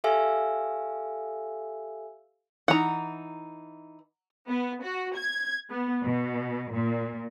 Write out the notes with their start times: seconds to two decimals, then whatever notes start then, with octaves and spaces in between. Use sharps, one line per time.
0.04 G4 A4 E5 F5 G#5 E6
2.68 E3 D#4 F#5 A#5
4.47 B3
4.83 F#4
5.16 G#6
5.71 B3
6.04 B2
6.71 A#2